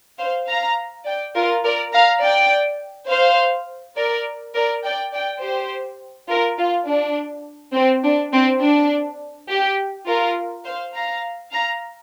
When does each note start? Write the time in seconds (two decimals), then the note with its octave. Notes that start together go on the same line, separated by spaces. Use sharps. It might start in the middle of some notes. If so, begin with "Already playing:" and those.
0.19 C5 F5
0.48 F5 A#5
1.06 D5 G5
1.35 F4 A#4
1.64 A#4 D5
1.93 F5 A#5
2.23 D5 G5
3.10 C5 F5
3.97 A#4 D5
4.55 A#4 D5
4.84 D5 G5
5.13 D5 G5
5.42 G4 C5
6.30 F4 A#4
6.58 F4
6.88 D4
7.75 C4
8.04 D4
8.33 C4
8.63 D4
9.50 G4
10.08 F4 A#4
10.66 C5 F5
10.95 F5 A#5
11.53 F5 A#5